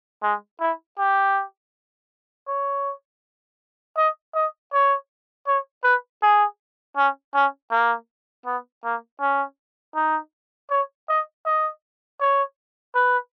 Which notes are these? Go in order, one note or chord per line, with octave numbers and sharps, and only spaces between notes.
G#3
E4
G4
C#5
D#5
D#5
C#5
C#5
B4
G#4
C#4
C#4
A#3
B3
A#3
C#4
D#4
C#5
D#5
D#5
C#5
B4